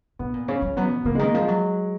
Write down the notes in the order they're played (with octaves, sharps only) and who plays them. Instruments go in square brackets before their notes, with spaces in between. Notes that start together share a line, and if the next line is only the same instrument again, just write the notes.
[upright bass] B2 [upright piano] B3
[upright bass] A#2
[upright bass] C#3 [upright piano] C#4
[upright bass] F3
[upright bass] F#3 [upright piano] B3
[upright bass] B2
[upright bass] C#3 [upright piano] A#3
[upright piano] G#3
[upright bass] D#3 [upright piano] A#3
[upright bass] F3 [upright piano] G#3
[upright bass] F#3